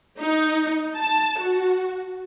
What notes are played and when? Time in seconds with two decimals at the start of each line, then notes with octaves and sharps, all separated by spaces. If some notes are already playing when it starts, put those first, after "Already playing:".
0.17 D#4
0.97 A5
1.39 F#4